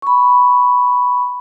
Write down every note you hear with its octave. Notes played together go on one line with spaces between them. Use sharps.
B5 C#6